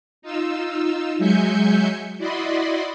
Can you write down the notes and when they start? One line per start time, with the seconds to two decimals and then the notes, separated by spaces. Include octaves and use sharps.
0.22 D#4 F4 E6
1.18 F#3 G#3 E5 G#5 G6 C#7
2.18 E4 F#4 D5 D#5 B5 C6